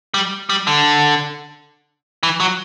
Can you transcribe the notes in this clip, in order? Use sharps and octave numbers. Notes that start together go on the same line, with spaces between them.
G3
G3
D3
E3
F#3